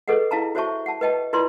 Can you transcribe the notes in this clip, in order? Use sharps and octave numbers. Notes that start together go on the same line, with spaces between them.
G#4 A4 B4 D#5 F#5
E4 F5 A5 A#5
F#4 C5 C#5 E5 A5 C#6
F#5 A5
B4 D#5 G5 A5
E4 F4 B4 D5 C6